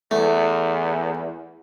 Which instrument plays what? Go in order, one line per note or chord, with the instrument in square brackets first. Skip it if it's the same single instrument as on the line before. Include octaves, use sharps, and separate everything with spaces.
[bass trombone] E2 [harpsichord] A3